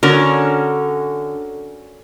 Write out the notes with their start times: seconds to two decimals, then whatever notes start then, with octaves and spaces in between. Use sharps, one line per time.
0.03 D3 C#4 F#4 A#4